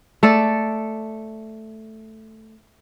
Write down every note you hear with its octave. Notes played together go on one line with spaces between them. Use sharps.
A3 A4 D5